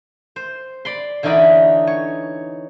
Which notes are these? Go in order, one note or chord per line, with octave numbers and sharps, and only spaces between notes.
C5
D5 B5 C6
D3 E3 C#4 D#4 D5 B5
C#5